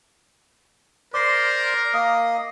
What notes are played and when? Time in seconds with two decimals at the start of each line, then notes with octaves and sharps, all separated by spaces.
1.14 A#4 C5 D5 C6 D6 C7
1.94 A#3 D#5 D#6